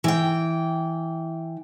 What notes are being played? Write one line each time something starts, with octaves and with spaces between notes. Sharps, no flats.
E3 G5